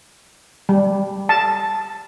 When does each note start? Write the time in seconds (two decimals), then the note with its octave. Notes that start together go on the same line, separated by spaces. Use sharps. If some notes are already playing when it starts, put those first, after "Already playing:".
0.69 G3
1.29 A5